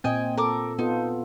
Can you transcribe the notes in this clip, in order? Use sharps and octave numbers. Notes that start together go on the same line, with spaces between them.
A#2 C4 D#5 G5 G#5
A4 A#4 D6
B3 D#4 F4 A4